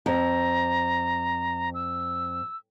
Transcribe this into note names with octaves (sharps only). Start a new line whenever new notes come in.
F2 A#5
E6